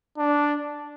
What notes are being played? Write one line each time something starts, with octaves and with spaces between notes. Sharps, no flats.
D4